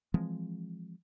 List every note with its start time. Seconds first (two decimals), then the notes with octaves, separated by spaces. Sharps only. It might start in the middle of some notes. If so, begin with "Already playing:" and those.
0.14 E3 F3 G#3 C4